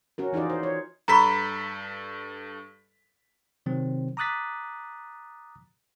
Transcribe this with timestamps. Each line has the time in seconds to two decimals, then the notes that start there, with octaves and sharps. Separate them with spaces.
0.18 C#4 F#4 A#4
0.33 E3 D#4 F4 G#4 D5
0.50 C5
0.63 C#5
1.08 G2 A4 A#5 B5 C#6 B6
3.66 C3 D#3 F#3 C4
4.17 A#5 D6 D#6 F#6 A6 B6